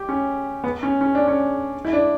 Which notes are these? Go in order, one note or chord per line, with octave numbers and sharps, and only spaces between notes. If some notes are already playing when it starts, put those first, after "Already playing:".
Already playing: G4
C#4
B3
C#4
C#4
D4
C#4
E4
D4